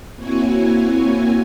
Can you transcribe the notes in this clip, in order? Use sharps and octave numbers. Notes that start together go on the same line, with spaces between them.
A#3 C4 E4 F#4 C#5 G#5